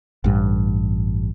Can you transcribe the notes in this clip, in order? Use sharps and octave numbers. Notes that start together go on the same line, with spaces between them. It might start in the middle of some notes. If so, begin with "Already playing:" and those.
A1 G2